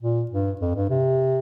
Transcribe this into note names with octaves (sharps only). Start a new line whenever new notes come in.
A#2
G2
F2
G2
C3